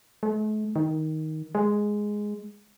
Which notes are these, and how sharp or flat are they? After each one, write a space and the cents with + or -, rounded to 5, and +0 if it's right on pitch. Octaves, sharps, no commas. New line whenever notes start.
A3 -45
D#3 +10
G#3 +0